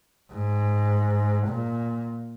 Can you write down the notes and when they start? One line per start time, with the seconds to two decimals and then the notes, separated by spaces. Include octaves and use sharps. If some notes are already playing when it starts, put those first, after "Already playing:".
0.33 G#2
1.48 A#2